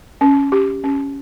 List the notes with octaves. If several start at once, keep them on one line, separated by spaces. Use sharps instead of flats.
C#4
G4
C#4